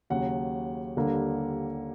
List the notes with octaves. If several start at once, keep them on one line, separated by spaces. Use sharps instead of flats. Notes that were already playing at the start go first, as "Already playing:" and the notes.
D#2 C#3 F#3 F#5
D#2 D3 G3 A#3